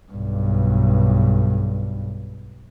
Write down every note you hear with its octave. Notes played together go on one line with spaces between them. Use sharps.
B1 G2